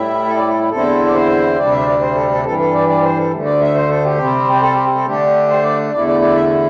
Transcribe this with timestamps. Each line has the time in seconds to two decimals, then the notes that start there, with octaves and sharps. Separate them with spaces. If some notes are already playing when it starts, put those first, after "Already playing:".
Already playing: A2 G3 E4 E5
0.27 A4
0.37 D5
0.48 A4
0.71 E2 D3 C4 E4 A4
1.06 D5
1.13 C5
1.57 D2 C3 G3 D4 D5
1.71 E5
1.79 C5
1.86 D5
2.01 C5
2.15 A4
2.30 A4
2.44 G2 E3 G3 A4
2.59 A4
2.73 D5
2.88 D5
3.03 C5
3.17 A4
3.31 D2 D3 A3
3.45 D5
3.61 E5
3.74 C5
3.89 A4
4.04 G4
4.18 C3 G3 C4
4.53 G4
4.62 A4
4.73 G4
4.95 A4
5.05 D3 A3 D4 G4
5.48 C5
5.63 D5
5.92 E2 D3 A3 E4 D5
6.07 D5
6.21 D5
6.35 E5